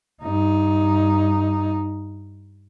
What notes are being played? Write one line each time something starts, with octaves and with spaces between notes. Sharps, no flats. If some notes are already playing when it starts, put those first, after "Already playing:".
G2 D#4